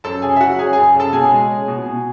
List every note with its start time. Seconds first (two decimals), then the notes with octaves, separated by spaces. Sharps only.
0.04 F#2 A4 A5
0.22 C#3 G#4 G#5
0.36 E5
0.41 F#3 F#4 F#5
0.59 C#4 G#4 G#5
0.73 F#2 G#4 G#5
0.95 C#3 A4 A5
1.13 B2 G#4 G#5
1.31 G#3
1.50 C#4
1.68 B2
1.86 B2